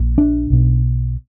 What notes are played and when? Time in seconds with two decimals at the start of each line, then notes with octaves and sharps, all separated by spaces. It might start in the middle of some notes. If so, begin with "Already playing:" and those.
Already playing: A#1 A#2
0.18 D4
0.50 B1 B2